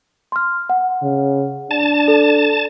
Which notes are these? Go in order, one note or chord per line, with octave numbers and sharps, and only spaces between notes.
C6 F6
F#5
C#3
D4 A5
A4